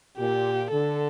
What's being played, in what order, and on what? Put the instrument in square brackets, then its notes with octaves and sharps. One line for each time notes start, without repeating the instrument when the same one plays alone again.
[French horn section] A#2 [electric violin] G4
[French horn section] D3 [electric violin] A4